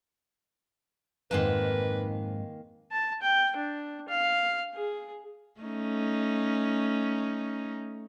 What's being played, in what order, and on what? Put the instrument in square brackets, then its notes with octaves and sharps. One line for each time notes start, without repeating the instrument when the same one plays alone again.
[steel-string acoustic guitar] F2 G#2 [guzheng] D#3 G#3 A#3 [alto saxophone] B4
[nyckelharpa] A5
G5
D4
F5
G#4
[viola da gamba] A3 C#4 D#4